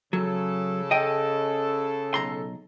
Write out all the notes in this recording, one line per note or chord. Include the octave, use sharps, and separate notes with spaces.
C#3 F#3 A4
D#5 G5
B1 A#5 C6